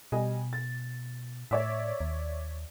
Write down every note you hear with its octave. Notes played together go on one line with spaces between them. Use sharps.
B2 G3 D#5 G#5
A6
A2 C#5 D5 E5
D#2